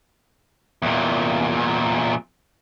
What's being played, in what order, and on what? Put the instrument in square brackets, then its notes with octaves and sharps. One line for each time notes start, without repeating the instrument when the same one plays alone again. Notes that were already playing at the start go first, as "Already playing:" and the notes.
[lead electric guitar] E2 A#2